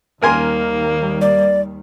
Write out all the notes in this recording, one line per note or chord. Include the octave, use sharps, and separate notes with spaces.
D#2 D#3 G3 A#3 A#4 G#5 C6
D5